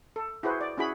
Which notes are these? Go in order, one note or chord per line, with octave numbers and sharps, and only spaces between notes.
A4
E4 F#4 G#4 B4 C5
D5
C#4 E4 F#4 G#4 B5